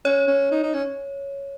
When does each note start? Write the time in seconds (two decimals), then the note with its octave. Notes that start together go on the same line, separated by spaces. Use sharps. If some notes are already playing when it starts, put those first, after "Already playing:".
0.05 C#4 C#5
0.28 C#4
0.51 D#4
0.63 D#4
0.74 C#4